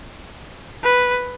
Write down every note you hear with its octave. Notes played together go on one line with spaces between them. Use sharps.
B4